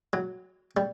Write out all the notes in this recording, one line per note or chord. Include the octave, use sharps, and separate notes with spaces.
F#3
G3